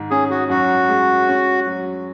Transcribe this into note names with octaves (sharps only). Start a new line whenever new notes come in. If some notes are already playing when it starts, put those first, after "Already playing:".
Already playing: G#2 D#3
C#4 G#4
F#4
F#2 F#4
G#3
C#4
F#3